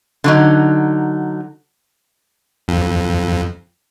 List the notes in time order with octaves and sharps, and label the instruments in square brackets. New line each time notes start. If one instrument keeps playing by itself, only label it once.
[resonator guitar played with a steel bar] D3 F#3 D#4
[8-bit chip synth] F2